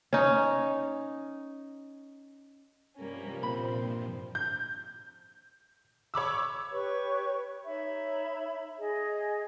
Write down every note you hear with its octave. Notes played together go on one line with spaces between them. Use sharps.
C#4 D#4
G2 C3 F3 G3 A#3 C#4
A#2 C4 B5
G6
C#5 B5 D6 E6
G4 B4 C#5 C#6
D#4 C#5 E5 B5
G#4 D#5